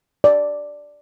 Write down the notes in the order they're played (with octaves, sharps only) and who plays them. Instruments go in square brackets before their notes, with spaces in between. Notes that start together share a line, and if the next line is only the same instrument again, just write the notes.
[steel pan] D5